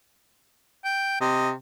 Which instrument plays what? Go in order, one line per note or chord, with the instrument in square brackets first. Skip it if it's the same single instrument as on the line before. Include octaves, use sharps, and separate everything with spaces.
[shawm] G5
[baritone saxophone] C3 [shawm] D#5